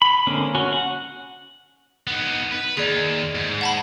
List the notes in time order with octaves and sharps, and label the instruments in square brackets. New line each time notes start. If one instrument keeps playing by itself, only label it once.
[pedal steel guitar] B5
D3 G#3 A#3 C4 C#4
C#4 F#4
F#5
[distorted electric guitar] B3 D#4
B4
[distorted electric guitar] D#2 [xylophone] G#4 D5
[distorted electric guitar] G#2
[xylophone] F#5 A5 B5